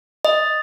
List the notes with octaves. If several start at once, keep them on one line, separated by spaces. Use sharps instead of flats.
D#5